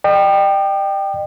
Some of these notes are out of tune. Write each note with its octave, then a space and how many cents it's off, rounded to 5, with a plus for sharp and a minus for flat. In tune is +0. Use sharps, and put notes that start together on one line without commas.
D#5 -45 G5 +0